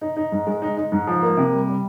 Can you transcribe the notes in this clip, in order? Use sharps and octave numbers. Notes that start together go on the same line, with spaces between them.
D#4
D#4
G#2
G#3
D#4
D#4
G#2
F3
A#3
C3
G3
G3